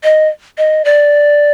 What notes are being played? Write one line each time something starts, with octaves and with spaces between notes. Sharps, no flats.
D#5
D#5
D5